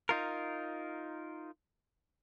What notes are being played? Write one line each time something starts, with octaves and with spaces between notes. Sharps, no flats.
D#4 F4 A#4